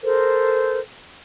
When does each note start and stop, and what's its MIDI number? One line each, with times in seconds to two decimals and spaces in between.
0.03 0.78 69
0.03 0.78 70
0.03 0.78 72